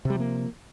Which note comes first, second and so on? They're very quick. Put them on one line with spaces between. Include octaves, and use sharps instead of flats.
C3 G3 F3 A#3